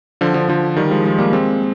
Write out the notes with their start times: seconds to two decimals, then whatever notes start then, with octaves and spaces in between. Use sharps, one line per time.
0.21 D3 F3
0.34 D3 F3
0.48 D3 F3
0.76 D#3 G3
0.91 F3 G#3
1.06 F3 G#3
1.18 G3 A#3
1.33 G#3 C4